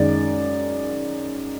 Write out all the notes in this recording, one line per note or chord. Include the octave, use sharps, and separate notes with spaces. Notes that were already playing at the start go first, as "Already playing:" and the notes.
Already playing: F#2 D#3 G#3 D#4 D5